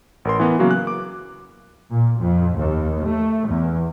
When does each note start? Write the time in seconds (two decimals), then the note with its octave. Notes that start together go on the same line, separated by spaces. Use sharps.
0.25 A1 A#4 C6
0.40 E3 B3 A#4
0.59 C#3 F#3 A#3 B3 F#4
0.71 F#6
0.87 D6
1.90 A#2
2.20 F2
2.58 D#2
3.06 A3
3.47 E2